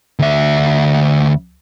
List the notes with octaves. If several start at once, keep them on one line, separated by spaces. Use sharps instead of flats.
D2 E5